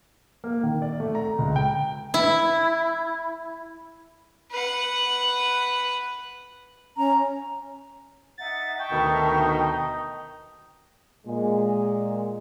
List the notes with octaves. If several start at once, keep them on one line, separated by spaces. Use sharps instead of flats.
A#3
D#3
D5
A3
A#5
C#2
G5
E4
B4 F#5
C#4 A#5
D#4 E5 F#5 A6
E5 G5 A5 C#6
D2 B2 D#3 D#4
A#2 G#3